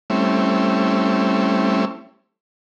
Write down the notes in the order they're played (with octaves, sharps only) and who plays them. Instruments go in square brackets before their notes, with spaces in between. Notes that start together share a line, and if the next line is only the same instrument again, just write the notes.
[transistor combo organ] G3 A3 C4 C#4 E4